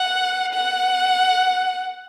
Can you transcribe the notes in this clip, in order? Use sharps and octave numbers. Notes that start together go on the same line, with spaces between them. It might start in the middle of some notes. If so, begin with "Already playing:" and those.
Already playing: F#5
F#5